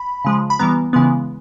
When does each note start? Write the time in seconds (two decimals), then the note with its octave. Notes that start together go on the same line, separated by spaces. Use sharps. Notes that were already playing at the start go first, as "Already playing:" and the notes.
Already playing: B5
0.25 C#3 F3 G#3
0.50 B5
0.59 E3 G3 B3 A#5
0.93 C#3 E3 G#3 B3